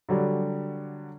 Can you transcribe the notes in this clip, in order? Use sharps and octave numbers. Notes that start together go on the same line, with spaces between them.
D3 F#3 G3